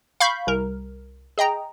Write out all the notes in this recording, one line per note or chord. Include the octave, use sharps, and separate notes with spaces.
F5 B5 C#6 G6 B6
C2 A#4
G#4 D#5 G5 A#5